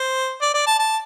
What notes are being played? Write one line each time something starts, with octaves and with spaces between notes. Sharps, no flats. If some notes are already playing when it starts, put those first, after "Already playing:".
Already playing: C5
D5
D5
A5
A5